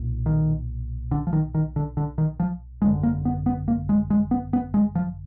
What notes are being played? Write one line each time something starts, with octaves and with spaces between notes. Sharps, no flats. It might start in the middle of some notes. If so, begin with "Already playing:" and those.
Already playing: B1 A#2
D#3
D3
F3
D#3
D#3
D3
D3
D#3
F3
G#1 F#2 D3 G#3
A#3
B3
B3
A#3
G#3
G#3
B3
B3
G#3
F3